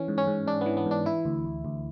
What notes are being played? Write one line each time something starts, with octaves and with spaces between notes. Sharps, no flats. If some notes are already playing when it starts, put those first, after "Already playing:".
Already playing: E3 C#4
G#2
C#4
G#2
G#2 D4
E3 B3
B3
G#2 D4
E3 E4
D2
D2
D2